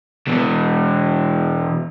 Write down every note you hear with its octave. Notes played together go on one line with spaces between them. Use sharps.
B2 E3